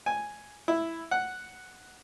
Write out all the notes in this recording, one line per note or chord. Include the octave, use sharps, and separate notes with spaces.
G#5
E4
F#5